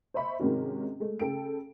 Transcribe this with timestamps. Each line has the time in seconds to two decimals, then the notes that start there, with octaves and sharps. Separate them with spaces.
0.14 C5 D#5 E5 B5 C#6
0.39 G#2 C3 D#3 C#4 F#4
1.00 G#3 A3
1.19 C#3 A4 G5 D7